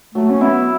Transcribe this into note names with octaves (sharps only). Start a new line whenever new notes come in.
F#3 A3
C#4
B3 E4